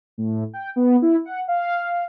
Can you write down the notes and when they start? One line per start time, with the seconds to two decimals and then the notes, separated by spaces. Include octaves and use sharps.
0.18 A2
0.53 G5
0.76 B3
1.02 E4
1.25 F#5
1.48 F5